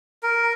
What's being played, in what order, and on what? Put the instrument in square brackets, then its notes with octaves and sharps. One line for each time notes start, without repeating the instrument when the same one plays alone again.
[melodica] A#4